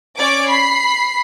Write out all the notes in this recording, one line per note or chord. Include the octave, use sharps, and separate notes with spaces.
C#4 C#5 D5 D6 D7
B5 C7